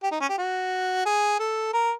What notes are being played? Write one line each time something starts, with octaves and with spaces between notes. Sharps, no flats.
G4
D#4
C#4
G4
F#4
G#4
A4
A#4